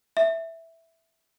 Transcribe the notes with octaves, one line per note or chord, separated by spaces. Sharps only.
E5